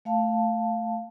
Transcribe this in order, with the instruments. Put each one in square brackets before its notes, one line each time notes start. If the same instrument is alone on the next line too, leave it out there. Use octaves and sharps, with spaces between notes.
[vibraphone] A3 F5 A5